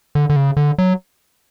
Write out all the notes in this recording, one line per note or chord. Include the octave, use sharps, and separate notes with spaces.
D3
D3
C#3
D3
F#3